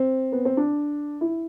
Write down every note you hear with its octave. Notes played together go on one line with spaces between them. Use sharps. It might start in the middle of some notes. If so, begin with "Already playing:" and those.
Already playing: C4
B3
C4
D4
E4